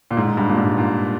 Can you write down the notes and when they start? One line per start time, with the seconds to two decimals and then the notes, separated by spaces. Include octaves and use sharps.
0.11 A#2
0.17 G#2
0.27 G#2
0.37 G2
0.49 A#2
0.57 G#2
0.78 A#2